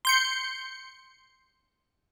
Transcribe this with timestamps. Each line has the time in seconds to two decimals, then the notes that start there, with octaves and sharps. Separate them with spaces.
0.05 C6 G6 C#7